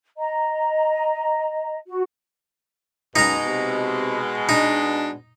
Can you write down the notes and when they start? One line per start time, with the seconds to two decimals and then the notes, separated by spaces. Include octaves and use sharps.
0.17 D#5 A#5
1.86 F#4
3.16 F#2 B2 G#3 D#4 A#5
3.45 C3
4.49 D4 D#4